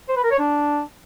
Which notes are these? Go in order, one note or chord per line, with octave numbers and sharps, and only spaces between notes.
C5
B4
A#4
C#5
D4